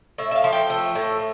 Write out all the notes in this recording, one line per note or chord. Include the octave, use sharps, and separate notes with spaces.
A2 E5
E5
F5
F3
G5
A3
A2